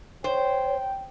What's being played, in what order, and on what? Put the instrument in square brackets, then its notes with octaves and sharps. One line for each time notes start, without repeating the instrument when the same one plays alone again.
[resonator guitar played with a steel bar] C5 [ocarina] C#5 [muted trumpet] G5